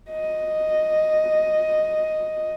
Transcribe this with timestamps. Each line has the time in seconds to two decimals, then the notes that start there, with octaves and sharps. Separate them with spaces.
0.11 D#5